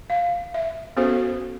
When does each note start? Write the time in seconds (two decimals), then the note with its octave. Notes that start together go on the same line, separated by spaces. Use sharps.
0.10 F5
0.54 E5
0.97 B3 C#4 F#4 A4 C5